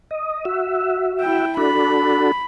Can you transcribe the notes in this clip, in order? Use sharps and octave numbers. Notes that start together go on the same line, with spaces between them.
D#5
F#4 E5
E4 G5
D4 F#4 A4 B5